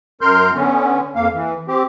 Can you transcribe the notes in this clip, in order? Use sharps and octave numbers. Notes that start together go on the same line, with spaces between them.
F#2 A#4 C6 F6 G6
D3 B3 C#4
F2 A#3 F5
E3
C4 G4